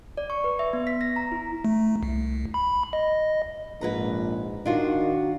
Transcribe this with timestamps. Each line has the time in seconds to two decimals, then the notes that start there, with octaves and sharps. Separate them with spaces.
0.17 D5
0.30 C#6
0.44 B4
0.59 E5
0.73 B3
0.87 B6
1.01 A#6
1.16 A#5
1.32 E4
1.65 A3
2.03 C2
2.54 B5
2.93 D#5
3.81 A#1 G#2 B4 A#5
4.66 D#3 D4 F4 F#4